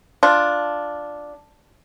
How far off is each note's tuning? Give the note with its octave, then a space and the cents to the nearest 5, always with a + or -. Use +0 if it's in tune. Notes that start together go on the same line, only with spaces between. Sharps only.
D4 +0 F4 +0